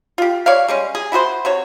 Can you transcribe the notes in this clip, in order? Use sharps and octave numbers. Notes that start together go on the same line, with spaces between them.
F4 G4
C#5 D5 F5
G3 G#3 C#4
G#4
E4 F#4 G#4 C5
C3 F#4 C#5